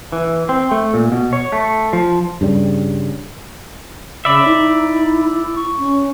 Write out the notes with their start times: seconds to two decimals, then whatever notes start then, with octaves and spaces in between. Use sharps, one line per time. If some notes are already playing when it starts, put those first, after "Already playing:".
0.12 E3
0.49 C4
0.71 A3
0.94 A#2
1.12 B2
1.33 C#5
1.52 A3
1.93 F3
2.41 G2 C#3 G3
4.25 C#3 D5 E5 B5
4.46 D#4 E4
5.56 C#6
5.78 C#4